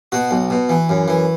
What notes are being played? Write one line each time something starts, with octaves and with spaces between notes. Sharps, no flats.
B2 F#4
B1
B2
E3
F#2
E3